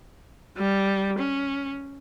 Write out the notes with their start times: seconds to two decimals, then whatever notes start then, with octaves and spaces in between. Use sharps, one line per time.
0.57 G3
1.19 C#4